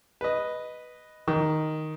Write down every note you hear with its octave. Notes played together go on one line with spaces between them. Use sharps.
B4 D#5
D#3